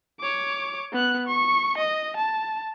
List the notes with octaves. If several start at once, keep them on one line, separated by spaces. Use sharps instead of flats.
C#5 D6
B3 F#6
C#6
D#5
A5